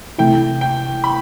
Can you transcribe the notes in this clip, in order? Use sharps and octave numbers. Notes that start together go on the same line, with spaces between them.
C3 E3 A3 E4 G5
G5
B5